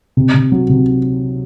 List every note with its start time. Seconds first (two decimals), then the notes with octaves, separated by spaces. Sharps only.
0.17 C3
0.34 C3
0.52 F#3
0.69 C3